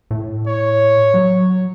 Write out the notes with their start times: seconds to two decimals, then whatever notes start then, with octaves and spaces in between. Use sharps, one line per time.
0.11 A2
0.47 C#5
1.14 F#3